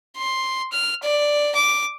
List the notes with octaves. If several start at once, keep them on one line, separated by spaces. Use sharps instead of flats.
C6
F6
D5
D6